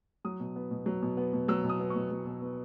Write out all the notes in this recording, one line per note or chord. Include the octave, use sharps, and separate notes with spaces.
F#3 D#6
B2
B3
B2
F#3
B2
B3
B2
F#3 E6
B2
D#6
B3
C#6
B2
F#3
B2
B3